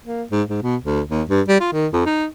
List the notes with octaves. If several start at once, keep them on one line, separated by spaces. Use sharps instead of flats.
A#3
G#2
G#2
B2
D2
D#2
G2
G3
F4
D#3
F2
D#4